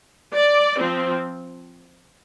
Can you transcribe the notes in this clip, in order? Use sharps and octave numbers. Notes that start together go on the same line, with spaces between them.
D5
F3 C4